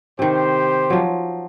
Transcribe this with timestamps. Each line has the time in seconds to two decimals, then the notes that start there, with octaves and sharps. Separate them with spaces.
0.19 C3 D#3 G4 C5
0.90 F3 F#3